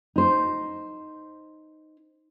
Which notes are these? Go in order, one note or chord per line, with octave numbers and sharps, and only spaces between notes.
D#4 C5